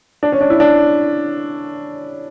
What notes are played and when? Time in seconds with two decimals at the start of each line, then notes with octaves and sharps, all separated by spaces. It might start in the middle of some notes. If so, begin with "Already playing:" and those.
0.23 D4
0.32 C#4
0.41 D4
0.50 E4
0.60 D4